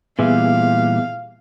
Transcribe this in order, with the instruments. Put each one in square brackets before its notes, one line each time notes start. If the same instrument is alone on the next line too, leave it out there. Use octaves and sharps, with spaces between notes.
[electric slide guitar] A#2 E3 G3 [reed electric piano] B3 G#4 E5 [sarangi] F5